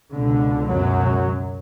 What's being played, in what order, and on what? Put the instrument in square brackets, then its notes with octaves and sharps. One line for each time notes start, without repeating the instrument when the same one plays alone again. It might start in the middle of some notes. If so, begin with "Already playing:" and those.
[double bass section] C#2 B2 D3
F#2 F#3